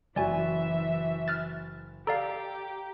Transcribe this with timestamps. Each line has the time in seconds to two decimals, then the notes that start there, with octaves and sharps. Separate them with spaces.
0.16 F#1 E3 F#4 D5 E5 G#5
1.28 F6 F#6 A6
2.07 G4 A4 D5 F5 A#5